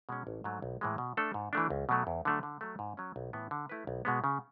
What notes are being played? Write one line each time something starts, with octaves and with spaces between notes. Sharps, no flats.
B2 G#3 C#4
A1
G#2 F#3 A3
B1
A2 E3 G#3
B2
A3 D4 A4
G#2
E3 A3 D4
C#2
B2 F#3 A3
E2
D3 F#3 A3 D4
D3
F#3 A3
G#2
F#3 C#4
B1
A2 E3 B3
D3
A3 E4 B4
B1
B2 G#3 B3
C#3